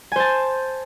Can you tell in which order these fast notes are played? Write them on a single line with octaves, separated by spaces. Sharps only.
G#5 C5 A5